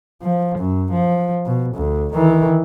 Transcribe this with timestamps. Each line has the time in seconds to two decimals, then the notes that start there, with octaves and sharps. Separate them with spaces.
0.23 F3
0.59 F#2
0.92 F3
1.46 B2
1.75 D2
2.14 D#3 E3